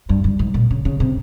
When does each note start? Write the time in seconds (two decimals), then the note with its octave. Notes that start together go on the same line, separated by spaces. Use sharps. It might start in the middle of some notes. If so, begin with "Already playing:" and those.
0.09 G2
0.24 G2
0.39 G#2
0.54 A#2
0.71 C#3
0.85 C#3
1.00 C3